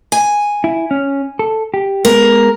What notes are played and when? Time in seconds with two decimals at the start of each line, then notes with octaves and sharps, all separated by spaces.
0.12 G#5
0.64 E4
0.91 C#4
1.39 A4
1.74 G4
2.05 G#3 B3 A#4